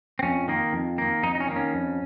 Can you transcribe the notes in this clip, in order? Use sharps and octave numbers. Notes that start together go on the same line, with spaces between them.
C4
F2 C#4
D#3 A#3
F2
D#3 A#3
F2 D#4
D#4
C#4
D#3 A#3
C#4
F2